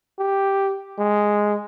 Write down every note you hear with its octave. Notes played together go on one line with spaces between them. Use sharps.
G4
G#3